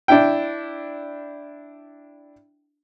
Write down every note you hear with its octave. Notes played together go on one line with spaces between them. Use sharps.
D4 E4 G5